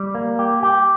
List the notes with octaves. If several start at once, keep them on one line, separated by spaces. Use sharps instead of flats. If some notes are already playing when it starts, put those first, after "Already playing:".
Already playing: G3
A#3
G4
G4